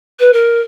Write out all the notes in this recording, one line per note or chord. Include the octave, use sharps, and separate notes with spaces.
B4
A#4